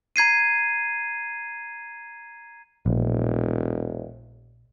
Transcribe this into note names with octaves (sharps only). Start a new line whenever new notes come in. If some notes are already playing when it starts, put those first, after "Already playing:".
A#5 G#6 C7 D#7
E1 A#1